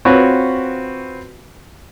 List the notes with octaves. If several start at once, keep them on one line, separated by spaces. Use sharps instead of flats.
C4 F4 F#4 B4 C#5